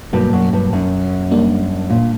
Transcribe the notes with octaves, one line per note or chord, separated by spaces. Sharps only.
G2 B2 F#3 A#3
F#2
G2
F#2
G3 A#3 D4
A#2